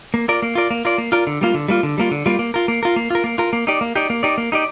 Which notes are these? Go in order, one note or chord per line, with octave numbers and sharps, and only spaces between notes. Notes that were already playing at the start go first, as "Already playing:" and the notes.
A#3
F4 A#4 D5
A#3
F4 A#4 D5
A#3
F4 A#4 D5
A#3
F4 A#4 D5
D3
G3 A#3 F4
D3
G3 A#3 F4
D3
G3 A#3 F4
D3
G3 A#3 F4
A#3
F4 A#4
A#3
F4 A#4
A#3
F4 A#4
A#3
F4 A#4
A#3
D#4 G4 D5
A#3
D#4 G4 D5
A#3
D#4 G4 D5
A#3
D#4 G4 D5